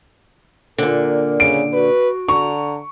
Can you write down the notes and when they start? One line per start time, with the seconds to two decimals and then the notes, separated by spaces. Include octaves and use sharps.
0.78 A#2 D3 A#4
1.40 C#3 D7
1.73 F#4 B4
2.28 D3 A#5 C#6